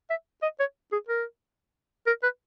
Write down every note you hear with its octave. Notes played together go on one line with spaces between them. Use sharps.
E5
D#5
C#5
G#4
A#4
A#4
B4